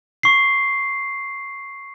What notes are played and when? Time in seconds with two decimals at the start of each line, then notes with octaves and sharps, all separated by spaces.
0.23 C#6 C7